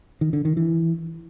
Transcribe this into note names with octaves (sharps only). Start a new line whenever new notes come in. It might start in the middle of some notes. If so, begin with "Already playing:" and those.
D#3
D3
D#3
E3